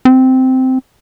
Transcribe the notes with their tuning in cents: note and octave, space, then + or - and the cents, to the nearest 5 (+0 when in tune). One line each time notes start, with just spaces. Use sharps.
C4 -10